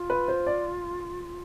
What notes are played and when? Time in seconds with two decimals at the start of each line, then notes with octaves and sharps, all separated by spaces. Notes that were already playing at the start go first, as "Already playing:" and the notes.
Already playing: F4
0.10 B4
0.28 C5
0.47 D5